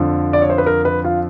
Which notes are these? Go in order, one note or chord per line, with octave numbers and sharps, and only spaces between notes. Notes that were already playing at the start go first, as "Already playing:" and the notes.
Already playing: F2 D3 F3
D5
C#5
C5
B4
A#4
B4
F4